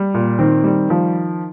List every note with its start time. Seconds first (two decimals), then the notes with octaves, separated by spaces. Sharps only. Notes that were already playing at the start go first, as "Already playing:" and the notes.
Already playing: G3
0.14 A#2
0.39 D#3 C4
0.64 G3
0.90 F3